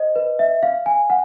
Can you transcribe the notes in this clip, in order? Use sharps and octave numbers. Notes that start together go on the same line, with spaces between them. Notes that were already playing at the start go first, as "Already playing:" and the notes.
Already playing: C5 D#5
B4
E5
F5
G#5
F#5